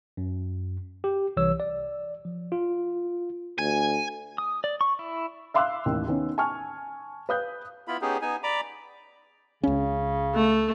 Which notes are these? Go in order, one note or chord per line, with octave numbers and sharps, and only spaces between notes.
F#2
G4
C2 E3 C#5 E6
D5
F3
F4
D2 G#5
D#6
D5
C#6
E4
E5 F5 C6 D6 E6 F#6
A1 D#2
D#3 B3 C#4
G#5 A5 C#6 F6
B4 F5 D#6 F#6 G6
B3 E4 F4 B5
B3 C#4 D#4 G4 G#4
B3 D#4 G#5
D5 A#5 B5 D6
C#2 C#3 C#4
A3